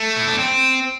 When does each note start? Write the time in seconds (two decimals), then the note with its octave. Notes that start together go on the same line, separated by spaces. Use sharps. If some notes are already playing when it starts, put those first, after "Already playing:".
Already playing: A3
0.16 E4
0.28 D4
0.38 C4